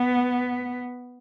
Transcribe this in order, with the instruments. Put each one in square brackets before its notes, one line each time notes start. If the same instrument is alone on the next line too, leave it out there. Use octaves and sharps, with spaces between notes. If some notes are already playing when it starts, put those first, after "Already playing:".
Already playing: [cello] B3